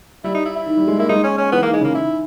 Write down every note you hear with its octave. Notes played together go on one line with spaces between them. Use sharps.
G3 E4
D#4
E4
E4
D#3
G3
G#3
A#3 E4
G#3 D#4
C#4
C#4
E3 B3
D#3 A#3
G#3
C#3 A#3
D#3 E4